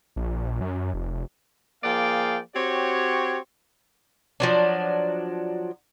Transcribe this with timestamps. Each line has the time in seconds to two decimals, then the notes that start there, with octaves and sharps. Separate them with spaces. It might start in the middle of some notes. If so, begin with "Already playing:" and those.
0.16 A#1
0.61 F#2
0.94 F1
1.83 F3 A#3 G#4 D5 F5 G5
2.55 C4 F#4 G4 C#5
4.40 F3 F#3 D4